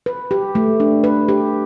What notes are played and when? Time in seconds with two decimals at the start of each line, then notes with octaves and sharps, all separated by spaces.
0.06 B4
0.31 G4
0.55 A3
0.80 D4
1.04 B4
1.29 G4